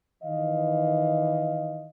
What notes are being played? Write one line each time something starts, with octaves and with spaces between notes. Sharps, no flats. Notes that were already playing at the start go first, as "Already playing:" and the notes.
D#3 E3 D#5 F5